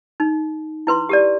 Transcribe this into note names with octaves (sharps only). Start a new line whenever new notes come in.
D#4
E4 B4 C6
G4 A4 D5